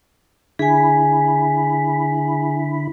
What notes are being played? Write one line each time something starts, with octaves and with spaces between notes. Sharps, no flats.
D3 E4 G#4 G#5 B5